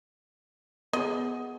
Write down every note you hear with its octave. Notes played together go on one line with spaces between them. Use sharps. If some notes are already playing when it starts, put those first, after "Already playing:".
B3 G#4 D#5